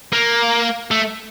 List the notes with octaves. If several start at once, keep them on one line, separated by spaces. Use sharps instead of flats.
A#3
A3